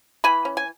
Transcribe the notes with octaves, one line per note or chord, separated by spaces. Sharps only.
E3 G#5 B5
C#4
G#5